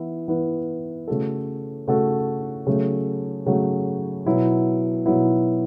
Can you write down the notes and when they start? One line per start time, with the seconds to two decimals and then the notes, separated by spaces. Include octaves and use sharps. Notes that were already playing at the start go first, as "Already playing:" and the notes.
Already playing: E3 B3 E4
0.28 E3 B3 E4 B4
1.08 C#3 A3 F#4 A4
1.88 C#3 A3 F#4 A4
2.67 C#3 F#3 A3
3.46 C#3 F#3 A3
4.26 B2 F#3 B3 E4
5.06 B2 F#3 B3 E4